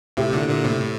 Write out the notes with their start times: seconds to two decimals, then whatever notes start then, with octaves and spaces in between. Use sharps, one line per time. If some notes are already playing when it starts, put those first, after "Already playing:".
0.17 A2 C3 E4 G4
0.33 A#2 D3
0.48 A#2 D3
0.64 A2 C3
0.81 A2